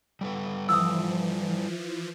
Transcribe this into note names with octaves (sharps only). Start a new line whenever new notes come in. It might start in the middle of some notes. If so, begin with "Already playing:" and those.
G3 A4 B4
E3 F3 D#6 E6